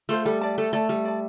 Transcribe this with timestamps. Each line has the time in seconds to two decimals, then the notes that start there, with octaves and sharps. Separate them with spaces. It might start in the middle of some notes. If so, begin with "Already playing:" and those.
0.09 A3 F4 A4 C5
0.25 G3 A4
0.41 D5 A5
0.58 A3 A4
0.73 A3 D5 A5
0.89 G3 A4
1.05 D5 A5